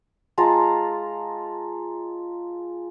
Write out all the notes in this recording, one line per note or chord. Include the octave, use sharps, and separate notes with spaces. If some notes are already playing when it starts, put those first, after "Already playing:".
G#3 F4 A5 A#5